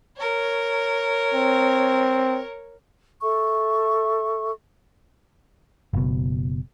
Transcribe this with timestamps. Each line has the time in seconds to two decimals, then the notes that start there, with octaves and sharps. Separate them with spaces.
0.17 A#4 C#5
1.34 C4
3.22 A4 E5 C#6
5.94 F#1 B2